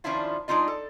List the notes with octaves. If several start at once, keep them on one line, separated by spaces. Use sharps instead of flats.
D#3 F3 C#4 D4 E4 F4
G#3 D4 D#4 F4 D#5
A4